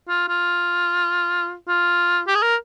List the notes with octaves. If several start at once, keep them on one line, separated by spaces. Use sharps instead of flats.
F4
F4
F4
G4
G#4
A#4